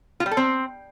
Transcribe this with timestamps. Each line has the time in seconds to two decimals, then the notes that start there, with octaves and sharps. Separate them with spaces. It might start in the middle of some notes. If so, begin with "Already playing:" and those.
0.20 F4
0.26 G3
0.31 A4
0.37 C4